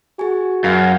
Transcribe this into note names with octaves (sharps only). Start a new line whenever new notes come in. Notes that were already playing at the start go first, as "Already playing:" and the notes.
F#4 G#4 G#5
F#2 F5